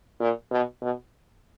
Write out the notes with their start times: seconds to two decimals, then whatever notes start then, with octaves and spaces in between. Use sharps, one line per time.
0.21 A#2
0.51 B2
0.82 B2